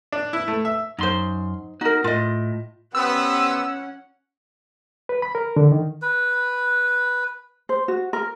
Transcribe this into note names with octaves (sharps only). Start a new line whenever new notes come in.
D4
E4
A3
E5
F#2 D#4 C5 C6
D#4 F#4 A#4
A2 F4 D#5
B3 C#4 G4 B4 C5 F#5 E6
B4
B5
A#4
D3
D#3
B4
C5
F#4
A#4